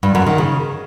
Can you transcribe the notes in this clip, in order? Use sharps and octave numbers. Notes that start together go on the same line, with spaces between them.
G2
F#2
D#3
C#3